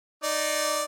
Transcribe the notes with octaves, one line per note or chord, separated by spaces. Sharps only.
D#4 D5